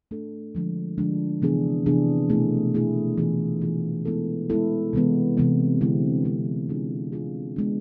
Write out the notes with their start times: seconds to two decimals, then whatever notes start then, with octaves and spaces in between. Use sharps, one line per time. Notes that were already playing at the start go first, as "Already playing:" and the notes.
0.11 A3 D4 A4
0.55 D3 F3 G#3 D4
0.98 D3 F3 G#3 D4
1.42 C3 E3 B3 D4 G#4
1.86 C3 E3 B3 D4 G#4
2.30 B2 A3 E4 G#4
2.74 B2 A3 E4 G#4
3.18 E3 B3 F4 G#4
3.62 E3 B3 F4 G#4
4.05 G#3 B3 E4 A4
4.50 G#3 B3 E4 A4
4.93 C3 E3 G#3 B3
5.37 C3 E3 G#3 B3
5.81 D3 G#3 C4 E4
6.24 D3 G#3 C4 E4
6.69 G#3 D4 F4 G#4
7.12 G#3 D4 F4 G#4
7.56 G#3 B3 D4